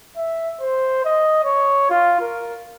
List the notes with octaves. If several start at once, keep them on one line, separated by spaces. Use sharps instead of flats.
E5
C5
D#5
C#5
F4
A#4